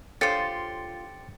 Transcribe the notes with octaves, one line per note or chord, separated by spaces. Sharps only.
D4 F4 G4 A4 C5 C#5 A6 C#7